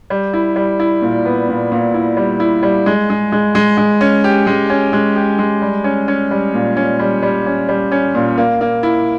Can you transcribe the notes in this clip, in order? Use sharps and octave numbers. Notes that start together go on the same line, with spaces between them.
G3
E4
G3
E4
A#2
B3
A#2
A#2
E4
G3
E4
G3
G#3
G#3
G#3
G#3
G#3
C#4
G4
G#3
C#4
G#3
G4
G#3
G3
C#4
C#4
G3
A#2
C#4
G3
G3
C#4
G3
C#4
A#2
A#3
A#3
E4